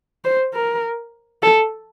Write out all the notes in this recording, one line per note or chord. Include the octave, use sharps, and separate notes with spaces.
C5
A#4
A4